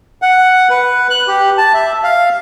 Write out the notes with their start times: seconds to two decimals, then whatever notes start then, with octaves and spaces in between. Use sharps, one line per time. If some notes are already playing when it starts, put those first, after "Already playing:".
0.22 F#5
0.70 B4
1.10 F#6
1.28 G4
1.58 A5
1.74 E5
2.04 F5